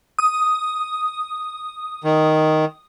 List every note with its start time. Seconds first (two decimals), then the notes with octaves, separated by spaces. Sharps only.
0.19 D#6
2.04 D#3